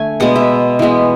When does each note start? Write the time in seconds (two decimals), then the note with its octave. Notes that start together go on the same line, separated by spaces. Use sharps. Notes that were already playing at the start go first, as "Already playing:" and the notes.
Already playing: D3 A3 G#5
0.20 B2 G#3 B3 F#5
0.36 E5
0.79 E3 G#3 B3